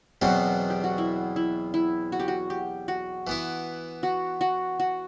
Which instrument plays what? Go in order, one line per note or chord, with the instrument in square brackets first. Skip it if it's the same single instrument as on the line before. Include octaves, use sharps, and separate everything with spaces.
[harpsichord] E2 B2 F#3 C4 [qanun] F#4
[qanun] G4
F#4
E4
E4
E4
F#4
G4
F#4
G4
F#4
[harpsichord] E3 B3 E4
[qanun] F#4
F#4
F#4